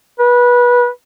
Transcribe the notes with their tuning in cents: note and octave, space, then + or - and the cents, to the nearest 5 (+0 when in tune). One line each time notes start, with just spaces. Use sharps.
B4 -20